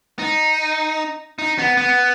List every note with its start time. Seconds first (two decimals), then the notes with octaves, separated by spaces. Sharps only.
0.19 D#4
1.39 D#4
1.58 B3
1.77 B3